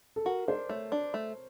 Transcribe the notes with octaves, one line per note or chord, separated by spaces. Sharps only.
A4
F#4 A#4
D4 C5
A3 C#5
D4
A3